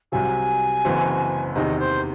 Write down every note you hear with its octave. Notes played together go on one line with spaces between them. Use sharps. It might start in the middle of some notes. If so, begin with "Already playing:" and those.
C2 C3 F#3 G#5
F#1 F#2 E3 C4 F#4
E2 C3 D#3 D#5
C5